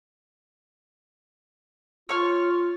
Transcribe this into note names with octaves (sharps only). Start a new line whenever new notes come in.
F4 C#5 C#6 F6